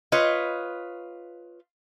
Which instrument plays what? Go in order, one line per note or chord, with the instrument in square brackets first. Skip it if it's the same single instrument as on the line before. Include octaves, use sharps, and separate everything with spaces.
[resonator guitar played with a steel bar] F4 B4 C#5 D#5